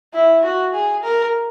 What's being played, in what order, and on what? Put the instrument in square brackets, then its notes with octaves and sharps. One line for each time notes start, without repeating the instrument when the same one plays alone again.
[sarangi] E4
F#4
G#4
A#4